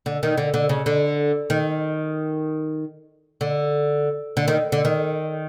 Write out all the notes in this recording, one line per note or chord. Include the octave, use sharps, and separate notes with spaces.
D3
D#3
D3
D3
C#3
D3
D#3
D3
D3
D#3
D3
D#3